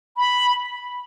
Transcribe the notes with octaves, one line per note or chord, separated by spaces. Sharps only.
B5